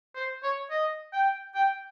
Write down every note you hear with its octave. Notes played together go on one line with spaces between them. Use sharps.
C5
C#5
D#5
G5
G5